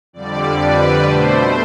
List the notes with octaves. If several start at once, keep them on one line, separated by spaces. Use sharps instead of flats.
F2 D3 G3 D5
B4
B2 A3 C5